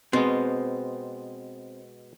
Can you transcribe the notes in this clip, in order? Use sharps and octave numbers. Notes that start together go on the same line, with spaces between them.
B2 G#3 B3 C4